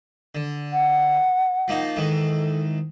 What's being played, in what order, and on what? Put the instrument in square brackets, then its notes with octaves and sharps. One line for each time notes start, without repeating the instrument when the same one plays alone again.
[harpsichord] D3
[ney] F#5
[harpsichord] F3 A#3 D#4
[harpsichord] G#2 D#3 E3 [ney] A4